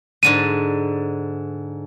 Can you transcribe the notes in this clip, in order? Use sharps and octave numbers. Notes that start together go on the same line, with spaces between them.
G#2 D3 G#3 D#7